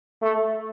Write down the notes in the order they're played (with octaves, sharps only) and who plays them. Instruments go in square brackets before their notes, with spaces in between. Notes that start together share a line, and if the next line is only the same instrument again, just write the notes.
[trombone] A3